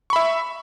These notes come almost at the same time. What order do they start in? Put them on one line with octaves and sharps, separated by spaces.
C#6 B5 E5